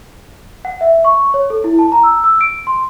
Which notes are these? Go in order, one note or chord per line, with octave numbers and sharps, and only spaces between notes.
F#5
E5
C#6
C#5
A4
E4
A5
A#5
E6
E6
D7
C6